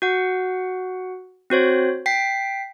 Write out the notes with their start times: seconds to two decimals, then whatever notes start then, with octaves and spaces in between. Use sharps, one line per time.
0.02 F#4 F#5
1.50 C4 F#4 C5 C#5
2.06 G5 B6 C7